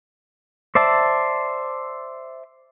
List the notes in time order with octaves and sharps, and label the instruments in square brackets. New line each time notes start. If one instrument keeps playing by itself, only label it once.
[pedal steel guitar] C5 D5 E5 A5